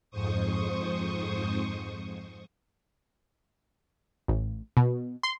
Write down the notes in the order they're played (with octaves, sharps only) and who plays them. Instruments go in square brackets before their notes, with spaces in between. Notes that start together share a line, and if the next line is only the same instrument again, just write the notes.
[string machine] F2 G#2 C5 C#6 D#6
[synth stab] A1
B2
C6